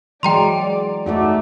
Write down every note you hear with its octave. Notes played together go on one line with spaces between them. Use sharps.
E3 F#3 G#3 D5 G5 A#5 C6
A3 D#4 F#4 D5